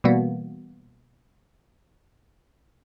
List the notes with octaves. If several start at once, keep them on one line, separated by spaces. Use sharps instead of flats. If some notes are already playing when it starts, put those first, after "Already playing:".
B2 E3 G3 A#3 B3